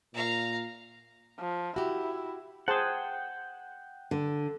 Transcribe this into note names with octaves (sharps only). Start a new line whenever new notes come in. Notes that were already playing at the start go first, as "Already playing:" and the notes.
A#2 F5 A#5
F3
E4 F#4 G4
G#4 C5 F#5 G5 A5
D3